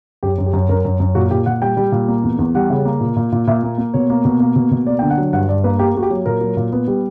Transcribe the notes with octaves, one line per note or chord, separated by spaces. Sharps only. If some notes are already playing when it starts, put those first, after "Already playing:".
F#2 G4
F#2
G4
F#2
F#2 A#4
F#2
F#2
A#2 F#4
A#2 G4
A#2 F#5
G3 G5
G3
A#2
A#3
E2
E2
G3 F#5
C#3
A#3
A#2
A#2
A#2
A#2 E5
A#3
A#3
B2 C#5
A#3
B2
A#3
B2
B2
A#3 D5
D3 G5
F#5
F#3
G2 F#5
G2 D5
A#3 B4
A#3 G4
A#3 F#4
G4
F#3
A#2 A#4
F#3
A#2
B3
G3